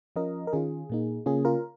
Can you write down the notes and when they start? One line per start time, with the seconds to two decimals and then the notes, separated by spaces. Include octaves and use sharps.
0.16 F3 C#4 F4 A#4 D#5
0.47 A#4
0.53 D#3 C#4 F4 G#4
0.90 A#2 A#3 D#4
1.26 C#3 A#3 C#4 F4 G#4
1.45 F4 A#4